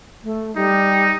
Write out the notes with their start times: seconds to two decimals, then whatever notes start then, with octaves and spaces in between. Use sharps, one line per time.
0.24 A3
0.56 G3 D#4